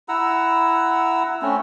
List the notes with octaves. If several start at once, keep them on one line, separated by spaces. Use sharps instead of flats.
E4 F#5 A#5 E6
A3 C4 C#4